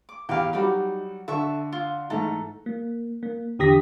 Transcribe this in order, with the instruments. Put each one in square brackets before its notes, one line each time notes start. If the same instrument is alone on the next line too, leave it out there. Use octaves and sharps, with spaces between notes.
[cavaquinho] D6
[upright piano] E2 [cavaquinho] G4 B4 F5
[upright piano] F#3 G3 F#4 [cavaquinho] D#4 B5 D6
[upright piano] D3 [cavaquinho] E5 A5 C#6
[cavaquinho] F4
[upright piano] G#2 E3 A3 [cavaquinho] A4 A#5
[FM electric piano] A#3
A#3
E2 D3 G4 D#6 A#6 B6